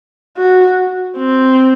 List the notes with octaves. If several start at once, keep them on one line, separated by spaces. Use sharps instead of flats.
F#4
C4